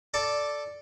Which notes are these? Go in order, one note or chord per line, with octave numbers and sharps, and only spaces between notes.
A4 D5 A5